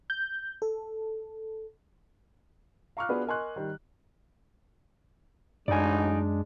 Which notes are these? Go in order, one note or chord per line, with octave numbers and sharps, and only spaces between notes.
G6
A4
F5 A#5 C#6 D6 F6 F#6
B3 D4 F4 F#4 G#4 B4
A#4 D#5 G#5 C6 C#6 F#6
D#3 G3
A1 F#2 F#3 G#3 D4 D#4 D5 G#5